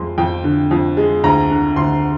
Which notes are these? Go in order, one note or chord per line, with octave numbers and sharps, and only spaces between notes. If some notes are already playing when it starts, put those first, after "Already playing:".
Already playing: F2 G#3 C6
F2 G5
D3
F2
G#3
D2 A#5
D3
D2 C6